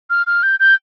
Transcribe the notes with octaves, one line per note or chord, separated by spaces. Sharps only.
F6
F6
G6
G6